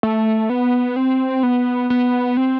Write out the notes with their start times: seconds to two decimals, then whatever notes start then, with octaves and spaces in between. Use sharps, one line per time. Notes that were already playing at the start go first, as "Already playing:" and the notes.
0.03 A3
0.50 B3
0.96 C4
1.43 B3
1.90 B3
2.37 C4